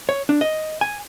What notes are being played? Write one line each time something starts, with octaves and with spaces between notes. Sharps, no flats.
C#5
D4
D#5
G#5